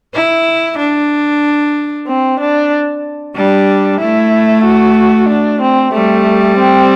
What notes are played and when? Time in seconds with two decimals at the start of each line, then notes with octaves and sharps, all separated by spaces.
0.15 E4
0.79 D4
2.08 C4
2.40 D4
3.36 G3 D4
4.00 A3 E4
4.65 F#4
5.29 D4
5.61 C4
5.93 G3 A3
6.58 C4